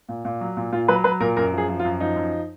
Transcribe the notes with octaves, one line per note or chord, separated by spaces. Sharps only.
A#2
A#2
F#3
A#2
A#2 F4
F#3 B4
F#3 B4
A#2 A#4
F#2 A#4
F3
G#4
F3
F4
F#2
F3 D#4
F#2